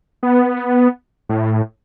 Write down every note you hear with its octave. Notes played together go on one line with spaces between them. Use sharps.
B3
A2